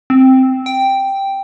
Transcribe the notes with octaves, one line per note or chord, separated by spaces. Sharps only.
C4
G5